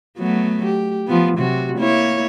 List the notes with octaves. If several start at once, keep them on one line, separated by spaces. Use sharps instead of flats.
F#3 A3 B3
G4
F3 B3
C3 F#3 F#4
A#3 E4 C#5